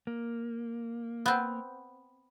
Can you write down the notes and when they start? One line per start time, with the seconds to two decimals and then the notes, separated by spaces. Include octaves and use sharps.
0.07 A#3
1.26 B3 C4